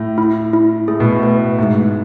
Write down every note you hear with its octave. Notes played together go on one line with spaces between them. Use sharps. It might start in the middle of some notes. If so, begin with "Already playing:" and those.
Already playing: A2
E4
E4
A2 G#4
B2
A2
B4
G#2 A3